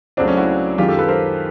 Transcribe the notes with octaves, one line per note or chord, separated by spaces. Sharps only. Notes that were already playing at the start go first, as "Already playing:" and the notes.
C#2 C#3 F#3 A3 C4 D4
C#4
E4 F#4
F#2 D#3 G#3 F4 G4
G4 A4
A4 B4
A#4 C5